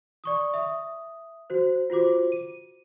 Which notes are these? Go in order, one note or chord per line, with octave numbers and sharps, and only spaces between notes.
D5 C#6 D#6
E5 D#6
F#4 C5
F4 F#4 C5 D6
D#7